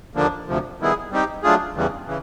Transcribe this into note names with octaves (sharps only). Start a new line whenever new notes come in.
D#2 D3 F3 A#3 D4
D2 C3 F3
D#3 G3 B3 E4 G#4
G3 C4 D#4 G4
F#3 A3 D4 F4 G#4
E2 C#3 E3 G3
C#3 E3